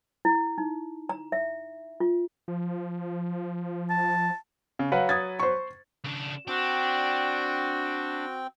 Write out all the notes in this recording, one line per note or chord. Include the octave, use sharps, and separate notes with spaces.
E4
D#4
A#5
E5
F4
F3
A5
C#3
F#3 B4 F5 F#5
D#6 G#6 A6
C5 C#6
C#3 D4
C4 D4 F#4 G5